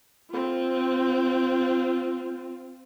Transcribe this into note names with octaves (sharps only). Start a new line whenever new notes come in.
C4 F4